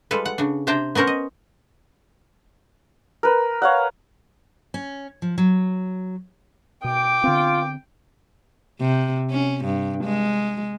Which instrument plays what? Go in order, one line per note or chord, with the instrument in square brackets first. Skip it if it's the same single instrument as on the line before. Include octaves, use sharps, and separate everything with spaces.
[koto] G3 G#3 F4 A4 B4
F#5
C#3 D4
C3 D4 C5 G5 A5 A#5
B3 C#4 A#4 C5 F#5
D#5
[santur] A#4 B4
C#5 F5 F#5
[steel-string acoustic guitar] C#4
F3
F#3
[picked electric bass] B2 [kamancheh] G5 [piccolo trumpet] D6
[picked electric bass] D3 B3 C4 [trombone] F4
[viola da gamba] C3
C#4
G2
G#3